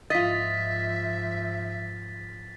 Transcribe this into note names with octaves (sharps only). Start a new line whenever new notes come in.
G#2 F3 F4 D#5 E5 A6 B6